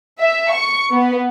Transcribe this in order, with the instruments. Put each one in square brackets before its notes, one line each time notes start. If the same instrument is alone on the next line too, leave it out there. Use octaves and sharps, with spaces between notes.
[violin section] E5
C#6
B3